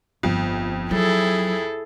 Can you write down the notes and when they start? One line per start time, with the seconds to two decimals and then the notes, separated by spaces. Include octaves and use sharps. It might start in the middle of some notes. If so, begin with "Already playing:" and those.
0.23 G1 F2
0.91 F#3 E4 G#4 A4